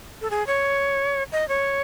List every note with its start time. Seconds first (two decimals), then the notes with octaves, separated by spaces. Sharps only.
0.21 A4
0.30 G#4
0.47 C#5
1.32 D#5
1.48 C#5